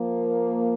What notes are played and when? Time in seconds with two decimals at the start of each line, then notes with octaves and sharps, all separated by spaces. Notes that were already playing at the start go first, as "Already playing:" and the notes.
Already playing: F3 A#3